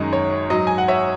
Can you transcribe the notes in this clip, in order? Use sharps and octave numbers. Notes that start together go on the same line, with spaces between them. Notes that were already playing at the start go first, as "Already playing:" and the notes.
Already playing: F#2 D#3 G#3 D#5
C#5
G#2 F#3 D#5
G#5
F#5
C#5 E5